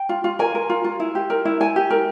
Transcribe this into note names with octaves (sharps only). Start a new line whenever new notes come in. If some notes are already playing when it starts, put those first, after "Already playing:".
Already playing: G5
F4
F4
A#4 G#5
A#4
F4
F4
E4
G4
A#4
E4
E4 G#5
G4
A#4